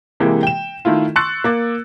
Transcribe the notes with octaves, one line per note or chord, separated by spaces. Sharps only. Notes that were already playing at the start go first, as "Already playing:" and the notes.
C3 E3 G#3 A#3 G4
G5 E7
D#3 A3 E4 F4
C6 C#6 E6 F#6 A6 C#7
A#3 D6 A6